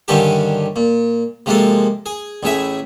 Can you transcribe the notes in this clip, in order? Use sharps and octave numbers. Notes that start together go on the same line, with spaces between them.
G2 D3 D#3 C#4 D4 G4
A#2
C3 F3 G#3 A#3 A4
G#4
A1 A2 G#4 E5